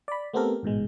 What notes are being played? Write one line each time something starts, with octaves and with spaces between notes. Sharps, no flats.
D5 B5
A3 B3 C4 G4 A4 A#4
A1 G#2 B2 G#3